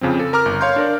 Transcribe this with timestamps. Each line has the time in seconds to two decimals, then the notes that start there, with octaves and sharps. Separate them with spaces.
0.01 F2 C#3 F3 C4
0.19 A4
0.33 A#4 A#5 D6 F6
0.46 G1
0.61 C#5 F5 C6 G6
0.76 D4 A#4 D5